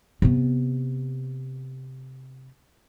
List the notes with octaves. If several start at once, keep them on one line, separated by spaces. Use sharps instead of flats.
C3 B3